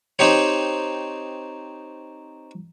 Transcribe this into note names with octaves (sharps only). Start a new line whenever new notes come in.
C4 D#4 G4 C#5